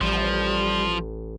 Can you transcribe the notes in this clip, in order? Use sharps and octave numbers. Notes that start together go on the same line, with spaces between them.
A1 F3 G3